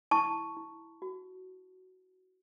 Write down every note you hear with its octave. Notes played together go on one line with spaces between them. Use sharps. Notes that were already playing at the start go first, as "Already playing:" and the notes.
E4 A5 C#6
E4
F#4